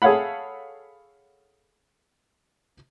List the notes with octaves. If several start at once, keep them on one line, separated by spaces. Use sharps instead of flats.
G#4 A4 C#5 F5 F#5 B5